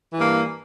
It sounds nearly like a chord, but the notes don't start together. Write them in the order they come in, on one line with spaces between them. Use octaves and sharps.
E3 G2 A#3